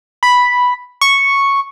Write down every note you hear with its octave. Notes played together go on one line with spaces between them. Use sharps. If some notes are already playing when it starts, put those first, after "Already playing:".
B5
C#6